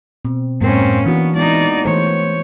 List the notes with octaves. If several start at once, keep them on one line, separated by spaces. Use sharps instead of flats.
B2 C4
F#2 A2 G#3 A#3 C4 C#4 A#4
E3 B3 D4 F#4
G#3 B3 D#4 E4 D5
E3 A3 G#4 C5 C#5